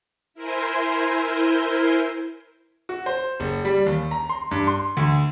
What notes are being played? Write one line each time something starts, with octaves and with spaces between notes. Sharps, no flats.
E4 A#4 C5 G#5 C6
F#4
C5
F#1
G3
D#2
A#5
C6
G2
C6
D2